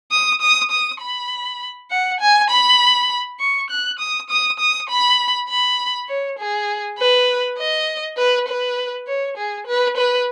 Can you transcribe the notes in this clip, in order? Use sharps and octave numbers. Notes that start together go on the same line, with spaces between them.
D#6
D#6
D#6
B5
F#5
G#5
B5
C#6
F#6
D#6
D#6
D#6
B5
B5
C#5
G#4
B4
D#5
B4
B4
C#5
G#4
B4
B4